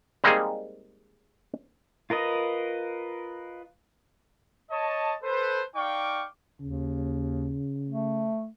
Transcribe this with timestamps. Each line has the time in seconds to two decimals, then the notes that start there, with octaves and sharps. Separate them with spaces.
0.24 G3 G#3 A#3 C4 D#4 G#4
2.10 F4 A#4 B4 D#5
4.71 C#5 D#5 A5
5.23 A4 B4 C5
5.76 D#4 D5 F5 G5 C#6 D6
6.60 D#2 C#3
7.88 A3